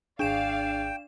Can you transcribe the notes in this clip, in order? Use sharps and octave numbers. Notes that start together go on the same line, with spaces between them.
G#1 D4 G#4 D5 F5 G5 E7